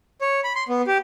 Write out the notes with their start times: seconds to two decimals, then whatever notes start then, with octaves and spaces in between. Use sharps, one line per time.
0.21 C#5
0.44 B5
0.55 C6
0.69 B3
0.87 G4